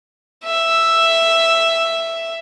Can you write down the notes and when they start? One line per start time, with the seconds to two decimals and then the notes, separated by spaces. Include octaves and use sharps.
0.44 E5